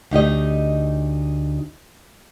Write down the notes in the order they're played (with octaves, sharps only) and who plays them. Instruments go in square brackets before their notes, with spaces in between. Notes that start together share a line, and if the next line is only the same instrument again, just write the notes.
[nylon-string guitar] D2 D#4 G4 D#5